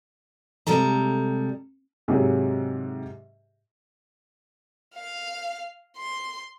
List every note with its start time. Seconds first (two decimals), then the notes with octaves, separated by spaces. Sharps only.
0.67 C3 G3 G#3 A4 A#5
2.08 G#2 C3 F#3 G4 G#4
4.95 F5
5.97 C6